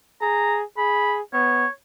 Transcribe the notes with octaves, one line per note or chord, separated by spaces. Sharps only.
G#4 A#5
G#4 B5
B3 C#5